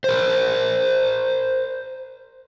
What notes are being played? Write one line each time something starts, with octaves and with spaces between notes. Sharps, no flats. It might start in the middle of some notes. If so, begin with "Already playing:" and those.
A#4 C5